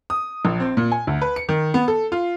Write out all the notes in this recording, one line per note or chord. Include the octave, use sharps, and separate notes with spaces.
D#6
A#1
C4
A#2
G#5
D2
B4
C#7
D#3
B3
A4
F4